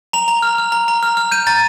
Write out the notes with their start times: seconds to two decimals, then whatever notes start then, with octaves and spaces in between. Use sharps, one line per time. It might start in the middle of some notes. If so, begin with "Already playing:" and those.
0.13 A#5 F7
0.28 A#5
0.42 F6
0.58 F6
0.72 A#5
0.88 A#5
1.03 F6
1.17 F6
1.31 G6 D#7
1.47 A#5 A6